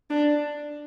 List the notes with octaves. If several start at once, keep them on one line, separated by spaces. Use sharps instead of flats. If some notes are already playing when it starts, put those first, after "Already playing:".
D4